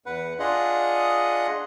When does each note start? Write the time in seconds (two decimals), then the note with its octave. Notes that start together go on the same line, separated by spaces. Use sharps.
0.06 E2 B4 F#5
0.39 D4 F4 G#4 D#5 F#5